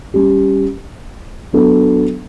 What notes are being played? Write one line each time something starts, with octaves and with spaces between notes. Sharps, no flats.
G3 C#4 G4
F#3 B3 D4 A4